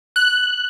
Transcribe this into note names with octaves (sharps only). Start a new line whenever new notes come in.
F#6